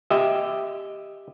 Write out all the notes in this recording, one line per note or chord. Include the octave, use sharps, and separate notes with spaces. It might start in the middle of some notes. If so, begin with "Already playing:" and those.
G4 D#5 E5